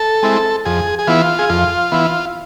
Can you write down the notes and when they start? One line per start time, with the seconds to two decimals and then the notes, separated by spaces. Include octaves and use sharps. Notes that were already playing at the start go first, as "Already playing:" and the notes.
Already playing: A4
0.23 G#3 C4 E4
0.65 F2 G#4
0.99 G#4
1.07 E3 B3 E4 F4
1.39 G#4
1.49 F2 F4
1.92 E3 B3 E4